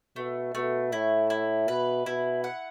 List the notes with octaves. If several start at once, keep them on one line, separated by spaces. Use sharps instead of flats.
B2 A3
B2 A3
A2 E4
E4
B2 B4
B2 E4
F#5